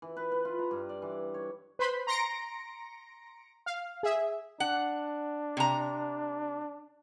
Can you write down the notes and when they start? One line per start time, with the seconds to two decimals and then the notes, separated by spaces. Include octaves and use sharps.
0.02 E3
0.17 B4
0.32 B4
0.45 F4
0.59 A#5
0.71 G2
0.89 D5
1.02 E3
1.34 C#5
1.79 B4 C5 B5 C6
2.07 A#5 C6 A#6 C#7 D7
3.66 F5
4.03 G#4 E5
4.60 D4 F#5
5.57 C3 A#5